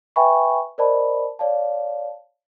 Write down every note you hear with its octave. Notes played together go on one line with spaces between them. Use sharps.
B4 E5 G5 G#5 B5 C#6
A#4 C5 D5 D#5 A5 B5
C#5 D5 F5 A5